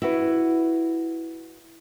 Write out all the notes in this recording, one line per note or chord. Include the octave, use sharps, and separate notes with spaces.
E4 F#4 B4